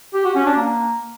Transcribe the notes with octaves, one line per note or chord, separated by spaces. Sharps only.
G4
F#4
C#4
D4
A#3